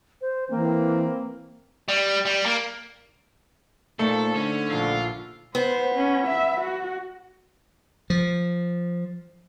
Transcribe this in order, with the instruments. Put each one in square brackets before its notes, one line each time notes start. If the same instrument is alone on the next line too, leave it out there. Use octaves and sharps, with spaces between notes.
[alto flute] C5
[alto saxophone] E3 [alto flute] A#3 [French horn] C4
[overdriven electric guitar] G3
G3
A#3
[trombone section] A#2 [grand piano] A3 [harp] D#4 C5 [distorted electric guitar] A4
[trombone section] D3 [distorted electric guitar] C#4
[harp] A#1 E6 [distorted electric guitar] F4
[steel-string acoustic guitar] B3 [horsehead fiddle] C5
[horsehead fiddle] C#4
E5
F#4
[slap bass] F3